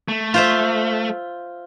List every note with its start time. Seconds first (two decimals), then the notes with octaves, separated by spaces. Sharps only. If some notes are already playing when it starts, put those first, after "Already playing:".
0.09 A3
0.34 F4 C5 E5